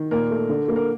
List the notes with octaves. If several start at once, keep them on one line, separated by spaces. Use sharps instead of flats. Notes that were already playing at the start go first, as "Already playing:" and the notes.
Already playing: D#3
A#2 A#4
A3
D3
A#3
A#4